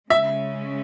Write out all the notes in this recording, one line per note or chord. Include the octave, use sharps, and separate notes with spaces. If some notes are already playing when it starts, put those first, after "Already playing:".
C#3 G#3 C#4 E5